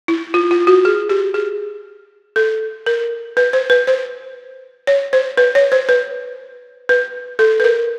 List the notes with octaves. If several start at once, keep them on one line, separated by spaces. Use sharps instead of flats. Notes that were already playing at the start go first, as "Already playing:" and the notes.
E4
F4
F4
F#4
G#4
G4
G#4
A4
A#4
B4
C5
B4
C5
C#5
C5
B4
C#5
C5
B4
B4
A4
B4
A#4